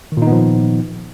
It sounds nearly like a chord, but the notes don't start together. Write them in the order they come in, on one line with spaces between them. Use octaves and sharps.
D#3 A#2 D#4 B3 F3